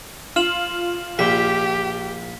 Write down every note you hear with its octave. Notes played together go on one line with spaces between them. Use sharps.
F4 F6 E7 F#7
A#1 G4 B6